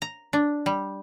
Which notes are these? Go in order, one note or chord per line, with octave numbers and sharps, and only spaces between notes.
A#5
D4
G3